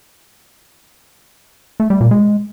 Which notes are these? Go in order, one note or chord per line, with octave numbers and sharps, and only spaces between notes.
A3
G3
A#2
G#3